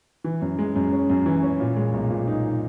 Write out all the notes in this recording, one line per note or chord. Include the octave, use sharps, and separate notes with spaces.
E3
F#2
G#3
F#2
C#4
F#2
E3
C#4
A#2
G#3
B1
A#2
D#4